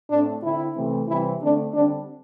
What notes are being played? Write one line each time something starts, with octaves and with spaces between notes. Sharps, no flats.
A2 A3 C4 D4
D3 C4 E4
C3 E3 A3 C4
C3 E3 G3 C4 E4
D3 A3 C4 D4
D3 G3 C4 D4